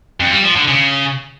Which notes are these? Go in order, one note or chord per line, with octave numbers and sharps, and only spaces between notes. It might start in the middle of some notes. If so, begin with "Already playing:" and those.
F2
G3
F3
D3
C#3